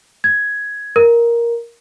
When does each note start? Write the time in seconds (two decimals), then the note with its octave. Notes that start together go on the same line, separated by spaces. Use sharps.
0.24 G#6
0.96 A#4